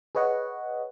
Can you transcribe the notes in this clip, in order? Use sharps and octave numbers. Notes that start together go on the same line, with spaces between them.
G#4 B4 C#5 D#5 F#5